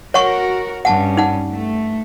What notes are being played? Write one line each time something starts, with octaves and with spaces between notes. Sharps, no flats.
F#4 A#4 C#5 F#5 C#6
G2 C#4 F#5 A5
D#4 F#5
A3